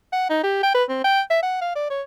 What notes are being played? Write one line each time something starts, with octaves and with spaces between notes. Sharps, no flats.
F#5
D#4
G4
G5
B4
C4
G5
E5
F#5
F5
D5
C#5